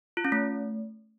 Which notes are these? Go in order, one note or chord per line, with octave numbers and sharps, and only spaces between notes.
F4
C#4
A3